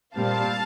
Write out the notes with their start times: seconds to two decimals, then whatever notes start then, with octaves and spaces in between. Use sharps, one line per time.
0.16 A#2 G3 C4 F5 A5